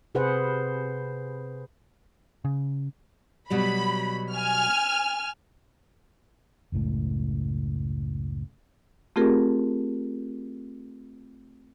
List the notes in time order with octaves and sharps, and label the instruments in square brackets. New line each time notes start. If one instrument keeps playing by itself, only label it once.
[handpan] C3 G#4 B4 C5 F#5
[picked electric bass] C#3
[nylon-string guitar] B2 F#3 G3 [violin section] B5
[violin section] G#5 F6
[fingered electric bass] F#1 C#2 A2
[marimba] A3 C4 F4 G4 G#4 A#4